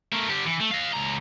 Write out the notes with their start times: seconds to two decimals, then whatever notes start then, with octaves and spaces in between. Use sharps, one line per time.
0.12 A3 A#4
0.29 D3 G4
0.46 E3
0.60 A3
0.71 D#5 F5
0.94 C#2 A#5